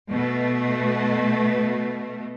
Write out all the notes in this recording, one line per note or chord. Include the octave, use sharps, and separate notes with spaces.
B2 A3